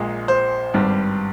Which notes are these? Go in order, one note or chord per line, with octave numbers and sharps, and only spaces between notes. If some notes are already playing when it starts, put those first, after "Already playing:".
Already playing: A#1 A#2 G#3
C5
G#1 G2 G3